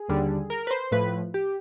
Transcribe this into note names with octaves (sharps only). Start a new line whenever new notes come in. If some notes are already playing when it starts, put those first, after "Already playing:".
Already playing: G#4
D#2 D3 G3
A#4
B4
C5
A2 F3 B4
G4